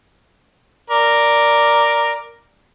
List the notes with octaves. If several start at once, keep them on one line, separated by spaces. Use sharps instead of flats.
A#4 D5